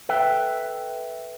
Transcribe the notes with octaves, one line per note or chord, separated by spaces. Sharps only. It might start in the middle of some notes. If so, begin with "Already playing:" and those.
A4 B4 E5 G5